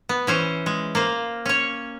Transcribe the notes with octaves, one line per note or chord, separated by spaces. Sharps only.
B3
E3 C#4 C5
G#3
A#3 F4 C5
C#4 C#5